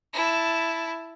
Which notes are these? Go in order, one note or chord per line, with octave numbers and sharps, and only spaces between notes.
E4 A5